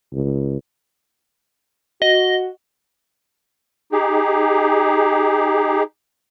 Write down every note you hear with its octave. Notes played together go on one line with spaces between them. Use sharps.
C#2
F#4 D#5
D#4 G4 G#4